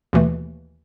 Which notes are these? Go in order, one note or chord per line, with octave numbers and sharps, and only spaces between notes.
D#2 B2 E3 A3